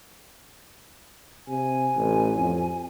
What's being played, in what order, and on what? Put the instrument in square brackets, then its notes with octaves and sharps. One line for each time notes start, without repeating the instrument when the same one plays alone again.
[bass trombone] C3 [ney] G#5
[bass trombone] A1
F2